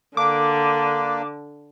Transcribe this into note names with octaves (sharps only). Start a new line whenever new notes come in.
D3 A#3 D4 D6